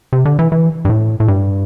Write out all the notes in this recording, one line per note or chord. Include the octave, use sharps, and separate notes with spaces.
C3
D3
E3
E3
G2
A2
A2
G2